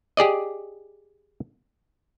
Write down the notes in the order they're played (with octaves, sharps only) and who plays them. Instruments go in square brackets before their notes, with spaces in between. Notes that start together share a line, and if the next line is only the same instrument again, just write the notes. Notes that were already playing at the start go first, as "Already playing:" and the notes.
[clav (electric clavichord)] G4 G#4 D5 D#5